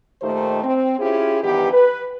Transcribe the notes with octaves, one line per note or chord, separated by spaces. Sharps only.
A#2 D#3 A3 D#4 G4 C5
C4
C#4 E4 F4 G4 G#4
G2 D#3 E3 B3 G4
B4